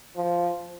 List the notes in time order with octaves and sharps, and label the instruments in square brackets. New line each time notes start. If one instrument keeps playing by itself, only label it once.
[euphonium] F3